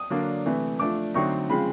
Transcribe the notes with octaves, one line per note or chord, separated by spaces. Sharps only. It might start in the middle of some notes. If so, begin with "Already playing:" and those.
Already playing: D#6
D3 F#3 A#3 D4
C3 E3 A3
F3 A3 D4 D6
D3 F#3 A3 C4 D#4 C#6
C#3 F3 G#3 C4 B5